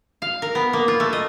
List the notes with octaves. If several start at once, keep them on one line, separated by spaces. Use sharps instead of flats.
F5
A#4
B3
A#3
F4
A3
D#5